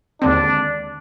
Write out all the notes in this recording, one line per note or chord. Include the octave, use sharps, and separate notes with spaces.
D#2 D3 G#3 C4 D4